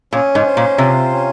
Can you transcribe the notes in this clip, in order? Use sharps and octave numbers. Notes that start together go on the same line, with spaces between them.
A#2 C#4
G#2
C5
A#2
C3 F4
C#4